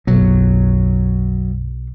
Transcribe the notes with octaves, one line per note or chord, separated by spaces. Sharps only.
F#1 B1 B2 F#3